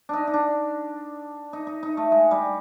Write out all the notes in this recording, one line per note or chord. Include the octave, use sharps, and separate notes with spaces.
D4 D#4
D#4
D4
D#4
D#4
D#4
A3
G#3
G3